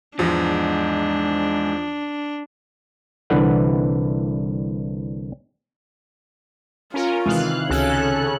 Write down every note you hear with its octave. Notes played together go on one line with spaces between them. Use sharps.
E2 G#2 F3 D4
C2 D3 E3 D4 B4 F#5
C#4 F4 A#4
C3 D#3 E3 G#3 F5 F#6
C#2 C#3 C#4 F#4 A4 F#6